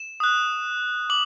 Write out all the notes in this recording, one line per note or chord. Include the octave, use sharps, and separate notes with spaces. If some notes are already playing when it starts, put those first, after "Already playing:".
Already playing: E7
D#6 F#6
D6 F#7